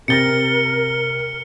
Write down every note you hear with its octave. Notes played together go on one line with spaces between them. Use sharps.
C3 A#4 A6 A#6 C#7 G7